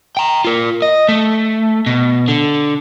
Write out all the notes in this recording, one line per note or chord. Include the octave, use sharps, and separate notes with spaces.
G5 A#5
F4 A#4
D#5
A3
B2
D3